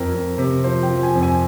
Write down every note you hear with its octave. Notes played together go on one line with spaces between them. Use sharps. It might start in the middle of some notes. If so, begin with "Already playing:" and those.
Already playing: F2 A#4
F2
C3
F3 C5
G5
F3
G#5
F2
G#5